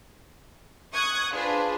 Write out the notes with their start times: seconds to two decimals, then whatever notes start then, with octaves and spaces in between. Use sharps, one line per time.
0.93 C#6 D#6 F#6 G#6
1.34 D4 F4 G#4 B4 C5